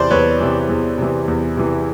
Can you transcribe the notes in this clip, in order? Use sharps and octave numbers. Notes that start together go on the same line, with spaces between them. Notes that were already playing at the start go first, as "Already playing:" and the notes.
Already playing: E2 C3 E3 C5 D5
E2 B4 C#5
C3 E3
E2
C3 E3
E2
C3 E3